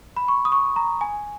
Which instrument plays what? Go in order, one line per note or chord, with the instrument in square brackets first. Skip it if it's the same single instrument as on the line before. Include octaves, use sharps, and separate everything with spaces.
[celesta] B5
C#6
D#6
C#6
A#5
G#5